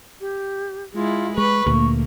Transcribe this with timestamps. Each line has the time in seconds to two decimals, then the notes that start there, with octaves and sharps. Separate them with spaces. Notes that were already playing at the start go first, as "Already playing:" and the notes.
0.21 G4
0.94 G#3 E4 F4
1.38 G#3 B4 C#6
1.66 D2 A#2 A3 A#3